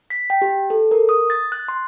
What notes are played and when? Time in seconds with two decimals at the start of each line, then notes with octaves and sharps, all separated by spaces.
0.10 B6
0.30 G5
0.42 G4
0.70 A4
0.91 A#4
1.09 D#6
1.30 A6
1.52 F#6
1.68 C6